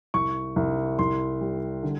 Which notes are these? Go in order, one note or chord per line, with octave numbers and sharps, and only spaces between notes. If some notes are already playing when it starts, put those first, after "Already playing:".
C2 C#6
C2
C2 C6
G3
D3